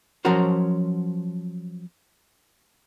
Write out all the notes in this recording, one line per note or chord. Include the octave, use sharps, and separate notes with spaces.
F3 F#3 C#4 F#4 A#4 C5